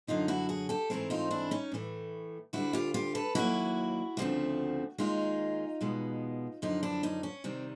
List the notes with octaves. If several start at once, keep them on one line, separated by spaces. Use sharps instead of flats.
F#2 D3 F#3 D#4 F4
E4 F#4
F#4 G#4
G4 A4
G#2 E3 A3 C4 G#4 A#4
D#4 F4
D4 E4
C#4 D#4
A2 E3 A3
D2 D3 G3 E4 F#4
F4 G4
F4 G4
A4 B4
D#2 D#3 F#3 A#3 E4 F#4
D2 C#3 F3 A3 C4
D#2 D#3 G#3 D#4 F4
E2 B2 G#3 B3
F#2 D3 F3 D#4 F4
D4 E4
C#4 D#4
C#4
C3 D#3 G3 C4